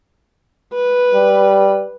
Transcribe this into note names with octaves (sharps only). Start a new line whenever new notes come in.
B4
G3